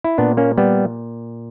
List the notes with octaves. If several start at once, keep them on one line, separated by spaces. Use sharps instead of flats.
E4
A#2 B3 D4
A#3 C#4
G3 B3